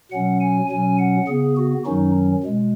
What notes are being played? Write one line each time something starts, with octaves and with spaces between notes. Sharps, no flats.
B2 F#3 C#4 F#5
G#5
B2 F#3 C#4 G#5
F#5
C#3 B3 G#4
F#4
F#2 D#3 F#3 C#4 D#4
B2 G#3